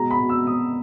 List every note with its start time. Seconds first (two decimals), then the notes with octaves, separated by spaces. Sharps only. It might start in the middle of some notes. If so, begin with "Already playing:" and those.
Already playing: B2 G#3 A#5
0.11 B5
0.20 B2
0.29 E6
0.47 B2 D#6